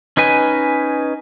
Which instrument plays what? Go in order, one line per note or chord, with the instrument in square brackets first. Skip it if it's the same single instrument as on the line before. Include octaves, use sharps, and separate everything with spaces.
[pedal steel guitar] C#4 D#4 B4 G#5